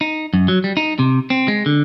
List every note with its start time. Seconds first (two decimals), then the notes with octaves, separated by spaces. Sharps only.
0.01 D#4
0.34 F#2
0.48 F#3
0.64 G3
0.77 D#4
0.99 C3
1.30 C4
1.48 G#3
1.66 D3